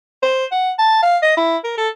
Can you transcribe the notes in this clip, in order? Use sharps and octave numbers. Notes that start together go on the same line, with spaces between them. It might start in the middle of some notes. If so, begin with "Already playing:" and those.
C5
F#5
A5
F5
D#5
E4
A#4
A4